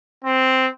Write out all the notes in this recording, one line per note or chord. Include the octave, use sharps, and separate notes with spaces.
C4